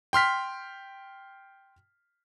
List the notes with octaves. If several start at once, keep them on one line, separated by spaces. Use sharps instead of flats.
G5 C6 F6 B6